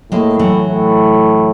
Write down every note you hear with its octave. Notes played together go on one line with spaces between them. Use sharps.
A2 G#3 A#3
E3 F#3
A2